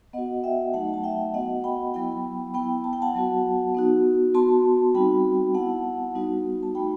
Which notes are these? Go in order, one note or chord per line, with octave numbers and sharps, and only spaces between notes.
B3 F#4 D#5 F#5
E5 G5
F#3 A3 D#4 F#5 A5
A5
E5 G5
B3 F#4 D#5 F#5
G5 B5
F#3 B3 E4 G5 B5
B3 E4 G5 B5
A5
G5
F#5 A5
F#3 B3 F#4
B3 D#4 F#4
B3 F#4 A5 C6
G3 C4 D#4 F#4 G5 B5
B3 E4 F#5 A5
G3 B3 D#4 F#4
A5
A3 D#4 F#4 G5 B5